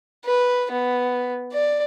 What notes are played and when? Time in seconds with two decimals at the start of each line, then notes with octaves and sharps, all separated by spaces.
0.24 B4
0.71 B3
1.52 D5